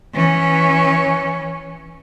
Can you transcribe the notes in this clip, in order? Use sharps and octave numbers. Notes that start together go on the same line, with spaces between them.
E3 C#4